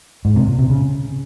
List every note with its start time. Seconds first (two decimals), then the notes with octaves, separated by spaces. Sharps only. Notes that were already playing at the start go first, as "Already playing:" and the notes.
0.25 G#2
0.36 C3
0.47 A#2
0.59 C3
0.70 C#3